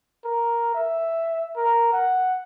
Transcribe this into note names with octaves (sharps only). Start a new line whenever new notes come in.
A#4
E5
A#4
F#5